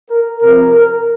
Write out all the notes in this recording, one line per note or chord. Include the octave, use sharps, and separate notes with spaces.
A#4
C3 F3 C4 A#4
A#4